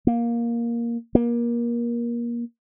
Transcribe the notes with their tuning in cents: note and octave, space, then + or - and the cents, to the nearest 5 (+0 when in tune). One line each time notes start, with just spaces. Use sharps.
A#3 +10
A#3 +25